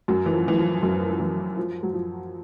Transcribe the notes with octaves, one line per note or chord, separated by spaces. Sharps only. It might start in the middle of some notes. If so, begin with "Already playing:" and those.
F#2 F#3
E3
F3
E3
F3
F#2 F#3
F3
E3
F3
F#3
F3